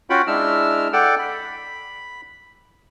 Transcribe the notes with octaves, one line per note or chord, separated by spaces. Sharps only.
C#4 F4 F#4 F#5 G5 B5
G#3 D4 E4 E6 F6
A4 D5 F#5 G5
B5